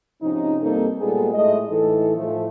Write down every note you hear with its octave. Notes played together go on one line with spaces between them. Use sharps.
G#2 C3 F3 C#4 D#4
G2 A#3 C4 D#4 A4
A#2 G3 G#3 B3 G#4 A4
A2 G#3 A3 D#5
A2 E3 D#4 A4
A2 F3 A3